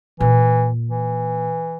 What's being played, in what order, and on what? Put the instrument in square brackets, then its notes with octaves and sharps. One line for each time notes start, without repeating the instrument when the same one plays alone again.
[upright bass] A#2 [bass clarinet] E3
[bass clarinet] E3